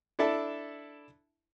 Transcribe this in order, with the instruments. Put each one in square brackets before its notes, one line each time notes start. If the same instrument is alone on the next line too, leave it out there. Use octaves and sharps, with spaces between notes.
[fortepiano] D4 E4 A4 E5 A5